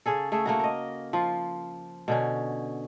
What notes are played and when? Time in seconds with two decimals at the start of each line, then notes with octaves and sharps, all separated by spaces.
0.06 C#3 C#4 G#4 A4
0.32 A3 G#4 E5
0.46 A3 A#3 F#4
0.60 A#4 D#5
1.13 F3 F4
2.08 B2 D3 C#4